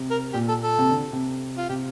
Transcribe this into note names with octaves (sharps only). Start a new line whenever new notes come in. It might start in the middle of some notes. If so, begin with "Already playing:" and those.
Already playing: C3
A#4
A#2 G4
A4
A4
C3
D3
C3
F4
C3 G4